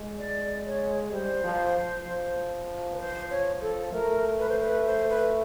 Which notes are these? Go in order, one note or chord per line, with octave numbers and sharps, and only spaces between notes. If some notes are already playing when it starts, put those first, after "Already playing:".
Already playing: G#3
D5
C#5
G3 C5
F3
F3
B4
C5
C#5
A4
A3 A#4
B4
C5
B4
C5
B4